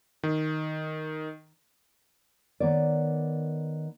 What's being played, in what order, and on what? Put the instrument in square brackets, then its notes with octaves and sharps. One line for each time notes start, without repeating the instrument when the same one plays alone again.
[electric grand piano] D#3
[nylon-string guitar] D#3 B3 C#5 D5